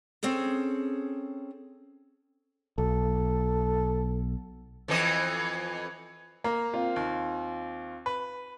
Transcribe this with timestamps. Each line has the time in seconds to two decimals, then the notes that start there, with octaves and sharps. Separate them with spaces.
0.23 C4 C#4 G#4 A4
2.78 B1 A4
4.88 F2 E3 D#5
6.44 A#3 A#5
6.74 C4 F4
6.96 D#2
8.06 B4